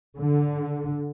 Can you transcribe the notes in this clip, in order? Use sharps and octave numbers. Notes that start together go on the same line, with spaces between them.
D3